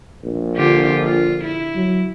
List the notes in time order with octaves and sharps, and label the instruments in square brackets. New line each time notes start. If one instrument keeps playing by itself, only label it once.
[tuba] A#1
[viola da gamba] D3 F4 G4
F4
E4
[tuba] F#3